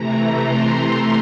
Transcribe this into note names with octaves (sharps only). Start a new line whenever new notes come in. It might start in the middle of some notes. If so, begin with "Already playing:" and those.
Already playing: C3 E3 A3 A#5
C6